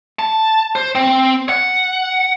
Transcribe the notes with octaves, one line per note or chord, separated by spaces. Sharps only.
A5
C5
C4
F#5